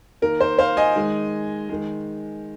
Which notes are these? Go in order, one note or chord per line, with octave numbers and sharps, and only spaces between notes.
D#3 A#3 A#4
C5
C5 F5
D#5 G#5
D#3 G#3
D#3 G#3